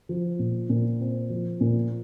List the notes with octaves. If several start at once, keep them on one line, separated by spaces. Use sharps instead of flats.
F3
A#2
A#2
C4
F3
A#2